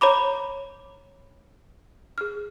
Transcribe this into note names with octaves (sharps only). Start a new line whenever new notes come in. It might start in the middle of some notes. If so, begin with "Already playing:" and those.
C#5 A#5 B5 D6
G#4 F6